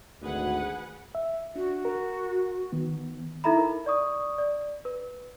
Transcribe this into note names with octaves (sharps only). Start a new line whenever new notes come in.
G#1 D2 G#4 B4 F#5
E5
D4 F#4
A#4
D#3 B3
D#4 E4 A4 E5 A#5 B5
A#4
D5 C#6 D#6
D5
B4